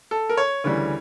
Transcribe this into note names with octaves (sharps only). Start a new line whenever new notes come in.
A4
A#4
C#5
D2 C#3 E3 G3